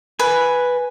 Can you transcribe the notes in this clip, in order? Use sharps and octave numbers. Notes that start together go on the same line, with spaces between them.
B4 G#5